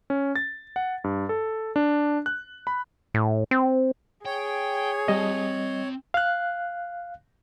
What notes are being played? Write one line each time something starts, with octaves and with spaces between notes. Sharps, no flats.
C#4
A6
F#5
G2
A4
D4
F#6
B5
A2
C4
G#4 C#5 G5
G3 C4 D#5 A5
F5 F#6